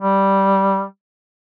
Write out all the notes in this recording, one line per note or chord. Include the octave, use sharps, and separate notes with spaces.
G3